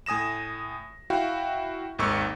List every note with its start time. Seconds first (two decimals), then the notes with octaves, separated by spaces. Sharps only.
0.06 A2 G#5 D#6 A#6 E7
1.10 E4 F#4 F5 G5
1.99 G#1 D#2 G#2 D#3 C#6 E6